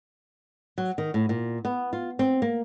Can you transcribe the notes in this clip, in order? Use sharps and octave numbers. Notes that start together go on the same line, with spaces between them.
F#3
D#3
A2
A#2
B3
F4
C4
A#3